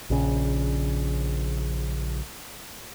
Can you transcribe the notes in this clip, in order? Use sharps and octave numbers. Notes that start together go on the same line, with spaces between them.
A#1 C#3